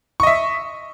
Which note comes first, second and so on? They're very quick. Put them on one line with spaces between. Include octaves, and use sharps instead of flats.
C#6 D#5 E5